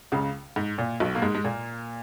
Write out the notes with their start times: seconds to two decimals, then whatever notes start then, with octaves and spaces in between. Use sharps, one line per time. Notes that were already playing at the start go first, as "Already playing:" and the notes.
0.12 C#2 C#3
0.56 G#2
0.78 A#2
1.00 B1 B2
1.15 A#3
1.22 G#2 G#3
1.35 G#3
1.45 A#2 A#3